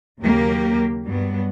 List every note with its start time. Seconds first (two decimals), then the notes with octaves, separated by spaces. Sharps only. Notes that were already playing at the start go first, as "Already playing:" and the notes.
0.21 D#2 C#3 F#3 A#3 G4 A#4
1.05 G2 F#3 G3 B3